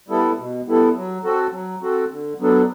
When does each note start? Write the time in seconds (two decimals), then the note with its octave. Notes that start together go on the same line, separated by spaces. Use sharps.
0.08 G3 B3 E4 A4
0.38 B2
0.66 G3 B3 E4 A4
0.95 F#3
1.24 C4 F#4 A4
1.52 F#3
1.82 C4 F#4 A4
2.10 D3
2.40 F#3 B3 D4 A4